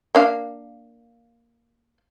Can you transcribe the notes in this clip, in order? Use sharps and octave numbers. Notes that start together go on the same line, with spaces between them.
A#3 D4 F5